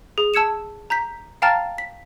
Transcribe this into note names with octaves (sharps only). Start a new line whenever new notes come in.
G#4
A5 E6 G#6 C#7 E7
A#5 G6 B6
F5 G5 A5 A#5 F6 A6
B6